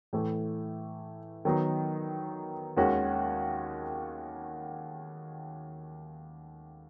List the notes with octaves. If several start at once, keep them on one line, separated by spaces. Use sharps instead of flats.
A2 E3 A3
D#3 F#3 B3 D#4
D#2 D#3 G#3 C#4 F#4